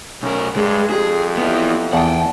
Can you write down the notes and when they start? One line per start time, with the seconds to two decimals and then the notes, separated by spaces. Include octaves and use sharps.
0.23 B1 C#4 A#4
0.56 G2 G#3 G#4
0.90 F2 G4 G#4
1.37 B3 E4
1.93 E2 F#5 G5 A5